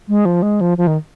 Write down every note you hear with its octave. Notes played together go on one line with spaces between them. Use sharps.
G#3
F3
G#3
F3
F3
D#3